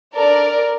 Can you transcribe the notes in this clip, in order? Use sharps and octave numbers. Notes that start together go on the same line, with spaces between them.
D4 A4 A#4 D5